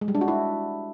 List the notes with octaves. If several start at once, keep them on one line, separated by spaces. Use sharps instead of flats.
G#3
G3
D4
F#4
E4